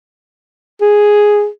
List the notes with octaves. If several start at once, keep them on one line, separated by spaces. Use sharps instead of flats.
G#4